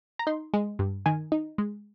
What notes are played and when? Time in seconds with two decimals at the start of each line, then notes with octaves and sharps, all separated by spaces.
0.19 A#5
0.27 D#4 C6
0.54 G#3
0.79 G2
1.06 D#3 G#5
1.32 D#4
1.58 G#3